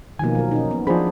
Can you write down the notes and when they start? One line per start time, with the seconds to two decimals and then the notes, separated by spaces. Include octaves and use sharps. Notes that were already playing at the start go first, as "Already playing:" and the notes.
0.19 B2 D#3 F3 A#3 G#5
0.35 F#3 A#4
0.51 C#4 D#4
0.71 B3
0.87 F3 D4 G#4 C5 B5